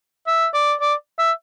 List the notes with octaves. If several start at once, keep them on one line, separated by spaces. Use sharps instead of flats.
E5
D5
D5
E5